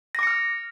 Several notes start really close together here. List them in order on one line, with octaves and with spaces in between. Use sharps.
A#6 D6 C#7 F6